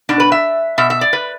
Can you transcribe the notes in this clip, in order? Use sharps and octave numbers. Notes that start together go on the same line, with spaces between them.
B2 D4
B4
E5
B2 E5
E5
D5
B4